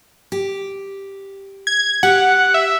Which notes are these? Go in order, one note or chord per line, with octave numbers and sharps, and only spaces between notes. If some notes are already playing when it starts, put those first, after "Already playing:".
G4
G#6
G4 F#5
E5